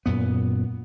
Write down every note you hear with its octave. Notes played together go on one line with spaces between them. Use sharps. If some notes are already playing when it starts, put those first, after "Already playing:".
F#2 A#2 B3